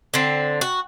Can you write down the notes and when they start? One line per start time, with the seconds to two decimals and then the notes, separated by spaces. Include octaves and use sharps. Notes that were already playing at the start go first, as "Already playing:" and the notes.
0.14 D3 C4
0.61 F#4